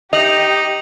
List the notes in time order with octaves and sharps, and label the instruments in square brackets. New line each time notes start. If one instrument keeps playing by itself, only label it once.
[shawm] D#4 [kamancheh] G4 [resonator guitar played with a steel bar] D#5 [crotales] F7 F#7